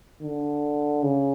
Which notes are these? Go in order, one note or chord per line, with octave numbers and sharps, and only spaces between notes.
D3
C#3